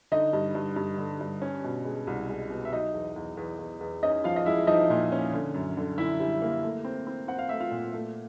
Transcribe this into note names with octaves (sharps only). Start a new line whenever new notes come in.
D3 D#4 D#5
G2
G2
G2
D3
G2
C#4
B2
G#3
C2
G#3
B2
E5
F#3 D#4 D#5
E2
E2
E2
E2
E2
C#4 D#4 D#5
F3 F4 F5
D#5
G#3 E4 E5
F3 D#4 D#5
A#2
C#4
D3
F#2
D3
D3 E4 E5
G3
A#3
A3
C4
C4
C4 F#5
F5
A3 E5
F4 F5
A#2
A3